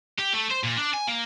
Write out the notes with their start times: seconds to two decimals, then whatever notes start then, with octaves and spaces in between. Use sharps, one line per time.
0.18 G4
0.33 A3
0.50 C5
0.63 A#2
0.77 D4
0.93 G#5
1.07 A#3